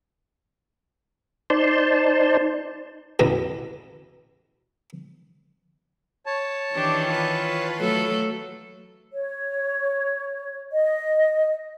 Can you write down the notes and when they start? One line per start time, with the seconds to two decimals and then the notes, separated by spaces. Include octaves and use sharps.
1.50 D#4 C5 D5 A5 C6
3.19 A1 E2 B2
6.26 C#5 A5
6.74 D#3 E3 D4 G4
7.07 F4 B4
7.79 F#3 A3 A4
9.12 C#5
10.73 D#5